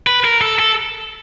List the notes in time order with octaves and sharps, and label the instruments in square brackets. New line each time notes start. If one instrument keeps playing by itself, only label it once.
[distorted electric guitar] B4
A#4
A4
A4